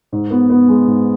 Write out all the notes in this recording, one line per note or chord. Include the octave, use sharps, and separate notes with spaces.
G#2
B3
B3
G#3
G#2